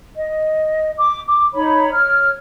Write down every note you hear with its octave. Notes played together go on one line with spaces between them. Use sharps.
D#5
D6
D6
D#4 C#5 B5
C#5 F6